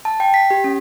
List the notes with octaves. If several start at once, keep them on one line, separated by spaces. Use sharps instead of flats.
A5
G5
B6
G4
C#4